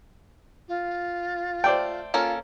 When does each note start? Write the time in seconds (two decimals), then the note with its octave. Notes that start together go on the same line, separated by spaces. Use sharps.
0.68 F4
1.64 A3 C5 D5 G5
2.14 A#3 C#4 F4 A4